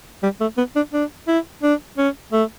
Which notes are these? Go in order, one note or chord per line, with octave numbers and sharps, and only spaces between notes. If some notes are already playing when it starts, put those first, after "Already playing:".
G3
A3
B3
D4
D4
E4
D4
C#4
A3